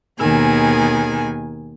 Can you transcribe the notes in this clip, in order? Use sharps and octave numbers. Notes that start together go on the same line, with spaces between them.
D#2 B2 D#3 G#4 G#5